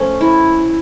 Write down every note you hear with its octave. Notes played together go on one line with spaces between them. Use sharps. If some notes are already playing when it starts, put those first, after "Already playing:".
Already playing: F3 A3 C#4
E4